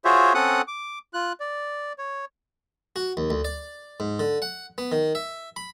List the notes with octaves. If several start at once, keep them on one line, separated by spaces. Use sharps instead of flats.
F4 F#4 G#4 C5 C#5 E5
C4 C#4 A4 F#5 D#6 F#6
D6
F4 F#6
D5
C#5
F#4
D#2
D2
D5
G#2
D3
F#5
B3
D#3
E5
B5